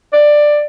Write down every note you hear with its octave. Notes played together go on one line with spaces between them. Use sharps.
D5